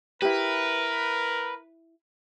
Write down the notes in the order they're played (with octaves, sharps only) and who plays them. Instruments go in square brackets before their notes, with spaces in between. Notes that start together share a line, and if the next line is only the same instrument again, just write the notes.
[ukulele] E4 G4 [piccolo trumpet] A#4 [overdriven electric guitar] B4